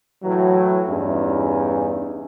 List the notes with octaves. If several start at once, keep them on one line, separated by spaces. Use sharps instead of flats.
A2 E3 F#3
E2 G2 E3 C#4 D#4